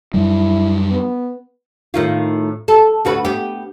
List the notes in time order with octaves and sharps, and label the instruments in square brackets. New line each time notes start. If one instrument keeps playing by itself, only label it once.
[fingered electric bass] F#2 G3 [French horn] E4
[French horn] B3
[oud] A2 D#3 F4
A4
D2 F#4 B4
B3 G4